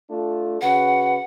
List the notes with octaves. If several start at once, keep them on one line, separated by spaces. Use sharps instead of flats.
A3 D4 F4
C#3 F#4 B4 F#5